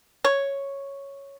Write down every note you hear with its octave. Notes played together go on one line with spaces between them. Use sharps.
C#5